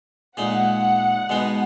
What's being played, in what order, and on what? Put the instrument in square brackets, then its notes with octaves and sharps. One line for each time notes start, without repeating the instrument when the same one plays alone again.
[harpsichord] A#2 G#3 D#4 [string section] F#5
[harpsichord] B2 G#3 B3 D#4